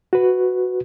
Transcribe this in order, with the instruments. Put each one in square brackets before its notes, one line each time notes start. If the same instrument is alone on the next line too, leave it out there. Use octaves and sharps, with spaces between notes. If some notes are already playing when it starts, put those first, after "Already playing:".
[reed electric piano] F#4 B4